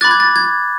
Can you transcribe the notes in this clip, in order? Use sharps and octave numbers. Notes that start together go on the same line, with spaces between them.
B5 D6 F#6 A6
G#6
A6
G#6